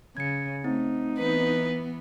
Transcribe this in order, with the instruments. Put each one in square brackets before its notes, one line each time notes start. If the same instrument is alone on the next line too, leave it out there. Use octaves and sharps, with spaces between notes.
[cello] C#3 [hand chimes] G#6 C#7
[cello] A3 [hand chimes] C4 [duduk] D#4
[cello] E3 B3 [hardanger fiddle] B4